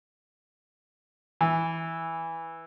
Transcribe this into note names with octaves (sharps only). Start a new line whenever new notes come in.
E3